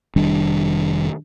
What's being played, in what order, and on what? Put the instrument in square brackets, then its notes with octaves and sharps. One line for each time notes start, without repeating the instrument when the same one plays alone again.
[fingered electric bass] F1 D#3 G3 D4